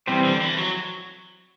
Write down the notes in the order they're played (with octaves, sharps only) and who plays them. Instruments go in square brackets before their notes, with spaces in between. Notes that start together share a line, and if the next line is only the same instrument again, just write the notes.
[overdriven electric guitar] C3 [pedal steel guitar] E3 G3 C4 G4 C5
[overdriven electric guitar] D3
E3
F#3